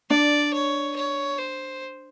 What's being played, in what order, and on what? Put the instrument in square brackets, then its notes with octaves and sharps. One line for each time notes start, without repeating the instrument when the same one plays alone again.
[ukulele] D4 [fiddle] D5
[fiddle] C#5
C#5
C5